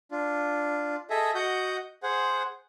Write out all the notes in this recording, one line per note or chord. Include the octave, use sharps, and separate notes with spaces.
D4 F4
G#4 A4 D#5 E5
F#4 D#5 F#5 G6
G#4 C5 F#5